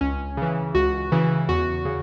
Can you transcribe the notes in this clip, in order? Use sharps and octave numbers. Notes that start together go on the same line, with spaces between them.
C#2 C#4
C#3 E3
C#2 F#4
C#3 E3
E2 F#4
C#3